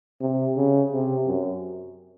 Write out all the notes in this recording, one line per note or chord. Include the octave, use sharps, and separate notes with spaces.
C3
C#3
C3
F#2